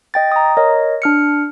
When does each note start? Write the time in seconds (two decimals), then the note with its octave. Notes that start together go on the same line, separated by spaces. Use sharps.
0.14 D#5 G5 A6
0.32 A#5 D#6
0.57 A#4 C#5 D#5
1.02 D4 F6 C#7